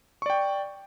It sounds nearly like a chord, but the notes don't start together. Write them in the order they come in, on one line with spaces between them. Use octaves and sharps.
C#6 D5 G5